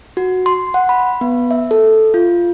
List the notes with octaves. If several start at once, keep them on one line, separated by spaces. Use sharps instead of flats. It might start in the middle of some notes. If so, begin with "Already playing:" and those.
F#4
C6
F#5
B5
B3
E5
A4
F4